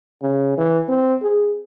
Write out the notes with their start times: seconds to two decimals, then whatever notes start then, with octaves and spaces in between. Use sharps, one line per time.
0.22 C#3
0.58 E3
0.88 C4
1.22 G#4